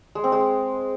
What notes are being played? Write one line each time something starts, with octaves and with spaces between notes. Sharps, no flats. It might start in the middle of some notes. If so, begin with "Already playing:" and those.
G#3
C4
G#3